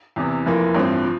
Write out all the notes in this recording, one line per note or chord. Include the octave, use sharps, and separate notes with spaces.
E2 C3 E3
F1 F2 E3 A#3
A1 G2 F3 C4
F3